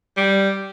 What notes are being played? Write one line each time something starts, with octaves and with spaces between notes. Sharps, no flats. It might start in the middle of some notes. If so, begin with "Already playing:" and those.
G3